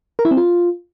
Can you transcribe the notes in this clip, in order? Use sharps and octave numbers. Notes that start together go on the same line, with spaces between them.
A#4
E4
C4
F4